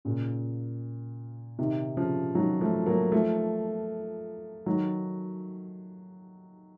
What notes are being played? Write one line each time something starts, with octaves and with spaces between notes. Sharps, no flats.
A#2 C#3
C3 D#3
C#3 F3
D#3 F#3
F3 A3
F#3 A#3
F3 A3
D#3 F#3